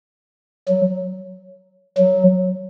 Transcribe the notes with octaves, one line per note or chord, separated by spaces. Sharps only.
F#3
F#3